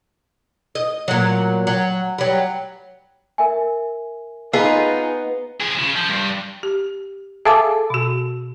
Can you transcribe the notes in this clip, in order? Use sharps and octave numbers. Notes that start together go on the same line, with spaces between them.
D#5
A#2 F#3
F#3
F#3 G3
A#4 E5 G#5
B3 D#4 F4 G#4 B4
F3 G#4
C#3
F3
G2
G4
G#4 A4 E5 F5 D6
B2 F#4